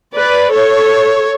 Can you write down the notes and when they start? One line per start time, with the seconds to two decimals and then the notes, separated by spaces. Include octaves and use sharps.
0.15 B4 D5
0.51 A4 C#5